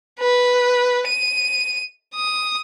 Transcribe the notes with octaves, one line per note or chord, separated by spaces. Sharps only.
B4
D#7
D#6